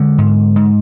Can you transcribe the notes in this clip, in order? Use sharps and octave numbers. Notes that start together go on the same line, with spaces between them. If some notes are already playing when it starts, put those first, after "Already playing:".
Already playing: D3 G#3
G#2
G#2